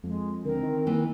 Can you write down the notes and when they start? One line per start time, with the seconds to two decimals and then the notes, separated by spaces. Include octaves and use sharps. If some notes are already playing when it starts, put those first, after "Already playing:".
0.04 F2 G#3
0.45 D2 C4 A#4
0.63 D#3
0.86 E3 A#3